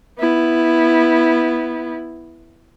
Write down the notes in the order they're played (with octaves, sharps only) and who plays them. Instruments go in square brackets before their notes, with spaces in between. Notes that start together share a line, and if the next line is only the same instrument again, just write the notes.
[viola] B3 E4